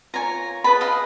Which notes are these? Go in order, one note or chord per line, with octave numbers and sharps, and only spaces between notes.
F4 A#4 C#5 G#5 A#5
G#4 B4 D#5 A5 B5
D#5 F5